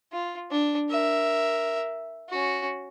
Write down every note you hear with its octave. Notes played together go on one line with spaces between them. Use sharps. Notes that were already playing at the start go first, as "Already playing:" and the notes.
F4
D4
A#4 E5
C#4 F#4